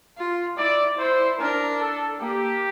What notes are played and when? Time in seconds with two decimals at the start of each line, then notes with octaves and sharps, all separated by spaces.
0.18 F4
0.58 E4 D5
0.98 E4 C5
1.38 D4 A#4
1.79 A4
2.20 A#3 G4